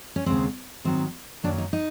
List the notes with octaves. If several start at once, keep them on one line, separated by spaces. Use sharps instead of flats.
C#4
D#2 C#3 F3 G#3 B3 C4
G#2 D#3 F#3 C4
F#2 D#3 F#3 A#3 D4
D#4
D#4